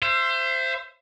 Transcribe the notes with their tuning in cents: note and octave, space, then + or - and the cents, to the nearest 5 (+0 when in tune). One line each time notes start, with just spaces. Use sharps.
C5 +0 E5 +35